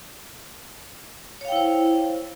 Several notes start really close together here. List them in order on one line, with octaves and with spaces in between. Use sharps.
C#5 F5 G5 E4 C5